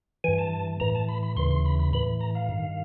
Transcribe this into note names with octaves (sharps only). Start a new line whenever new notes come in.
G2 E3 G#5
A5
A2 E3 A#5
A5
B5
B5
D#2 C#3 E3 C6
C6
B5
B5
A2 E3 B5
A#5
F5
G2 D#3